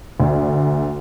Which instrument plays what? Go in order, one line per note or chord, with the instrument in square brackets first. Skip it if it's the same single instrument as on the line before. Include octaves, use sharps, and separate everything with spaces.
[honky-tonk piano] D2